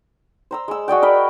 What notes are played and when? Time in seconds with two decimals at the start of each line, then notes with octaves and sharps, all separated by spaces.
0.51 C5 A#5 E6
0.68 G#3 E6
0.88 F#4 G#4 D5 G5
1.02 A#4 D#5 B5